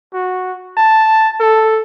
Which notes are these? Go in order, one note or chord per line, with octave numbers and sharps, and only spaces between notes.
F#4
A5
A4